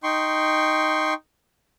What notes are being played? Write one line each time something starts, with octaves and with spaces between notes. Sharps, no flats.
D#4 G5 C6 C#6